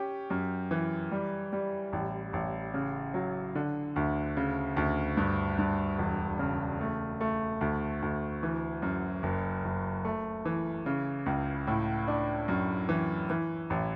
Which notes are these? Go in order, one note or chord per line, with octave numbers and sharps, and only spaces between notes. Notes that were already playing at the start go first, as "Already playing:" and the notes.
Already playing: C#4 G4
F#2
E3
G3
G3
A1
A1
C#3
F#3
D3
D2
C#3
D2
G2
G2
E1
C#3
A3
A3
D2
D2
E3
F#2
F#1
F#1
A3
E3
C#3
C#2
A2
D4
F#2
E3
E3
A1